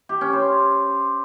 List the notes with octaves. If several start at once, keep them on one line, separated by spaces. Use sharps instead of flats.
G4
C#4
C5